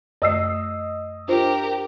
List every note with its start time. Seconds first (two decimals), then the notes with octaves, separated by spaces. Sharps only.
0.22 F#2 A3 D#5 E6 C7
1.28 D4 F4 G4 A#4 C5